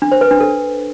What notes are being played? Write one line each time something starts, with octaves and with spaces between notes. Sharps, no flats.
D4
C5
B4
D4
A4